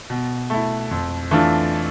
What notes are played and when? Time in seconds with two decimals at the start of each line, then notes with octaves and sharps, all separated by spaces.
0.10 B2
0.50 A3 E4
0.91 F2
1.31 E3 A3 D4 F4